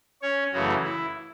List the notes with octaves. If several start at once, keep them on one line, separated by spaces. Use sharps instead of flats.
C#4 C#5
F#2 C#3 E3 A3 F#4
E4